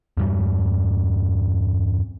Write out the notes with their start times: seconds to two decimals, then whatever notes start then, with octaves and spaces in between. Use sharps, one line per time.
0.17 E2 G2 G3